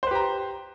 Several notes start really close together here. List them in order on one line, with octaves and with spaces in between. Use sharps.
C5 B4 G4 A#5